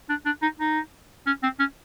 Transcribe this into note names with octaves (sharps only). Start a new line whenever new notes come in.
D4
D4
D#4
D#4
C#4
C4
C#4